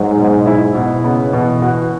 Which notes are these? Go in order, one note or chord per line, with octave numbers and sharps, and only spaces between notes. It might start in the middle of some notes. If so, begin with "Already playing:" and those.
Already playing: G#2 F#3
B2
E4
B2
C#3 B3
B2 E3
F#4